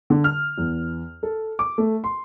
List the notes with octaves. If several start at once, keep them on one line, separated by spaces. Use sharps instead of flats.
D3
F6
E2
A4
D6
A3
C6